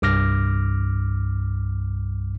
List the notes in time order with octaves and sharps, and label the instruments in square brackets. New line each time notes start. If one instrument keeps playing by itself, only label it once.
[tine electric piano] C2 G2 D6 F6 A#6